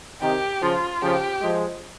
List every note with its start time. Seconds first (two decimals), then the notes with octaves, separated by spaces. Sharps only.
0.21 C3 D#3 G4
0.62 C#3 F3 F4
1.01 C#3 F3 G4
1.41 F3 G#3